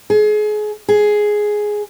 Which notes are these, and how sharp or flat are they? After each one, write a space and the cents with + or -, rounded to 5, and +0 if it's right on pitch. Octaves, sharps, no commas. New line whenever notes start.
G#4 +30
G#4 +5